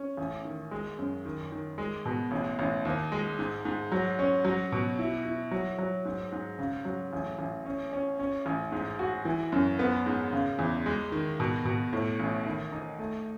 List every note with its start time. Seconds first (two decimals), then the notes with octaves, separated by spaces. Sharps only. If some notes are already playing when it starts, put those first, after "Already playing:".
Already playing: C#4
0.17 A1
0.45 D#3
0.71 G#3
0.98 F#2
1.25 D#3
1.52 D#3
1.78 G#3
2.06 B2
2.31 A1
2.59 A1
2.85 D#2
3.12 G#3
3.39 G#2
3.65 G#2
3.92 F#3
4.19 C#4
4.45 F#3
4.72 B2
4.99 E4
5.25 E4
5.51 F#3
5.78 F#3
6.05 G#2
6.32 G#2
6.59 C#3
6.85 F#3
7.13 A1
7.39 A1
7.66 C#4
7.93 C#4
8.19 C#4
8.46 A1
8.72 G#2
8.99 F#4
9.25 E3
9.52 F#2
9.79 B3
10.06 G#2
10.33 C#3
10.59 E2
10.86 G#3
11.12 D#3
11.40 B2
11.65 B2
11.93 A2
12.20 A1
12.46 D#3
12.72 D#4
12.99 A3